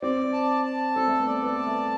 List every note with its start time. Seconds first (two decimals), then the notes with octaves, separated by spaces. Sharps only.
0.02 C4 D5
0.33 A5
0.65 A5
0.96 C4 A4
1.07 A3
1.20 B3
1.27 D5
1.43 B3
1.58 A5
1.67 A3